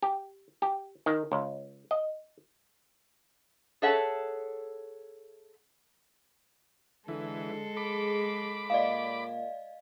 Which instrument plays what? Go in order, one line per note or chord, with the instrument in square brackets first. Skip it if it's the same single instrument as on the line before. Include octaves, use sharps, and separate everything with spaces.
[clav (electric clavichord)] G4
G4
D#3
C#2
D#5
[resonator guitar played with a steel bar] G#4 A4 C#5 E5 F#5 A5
[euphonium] D3 [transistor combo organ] E3 [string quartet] G#3 A4
[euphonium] G#4 [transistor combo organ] B5 D6
[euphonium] A#2 [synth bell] D5 D#5 F5